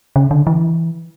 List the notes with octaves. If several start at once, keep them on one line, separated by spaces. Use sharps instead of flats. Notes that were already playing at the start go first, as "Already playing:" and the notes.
C#3
D3
E3